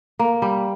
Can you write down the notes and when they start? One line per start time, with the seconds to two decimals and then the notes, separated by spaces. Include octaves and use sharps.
0.19 A#3
0.42 G3